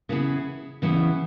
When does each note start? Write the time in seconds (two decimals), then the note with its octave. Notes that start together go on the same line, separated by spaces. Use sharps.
0.09 C#3 E3 B3 E4 G#4
0.82 C#3 E3 B3 E4 G#4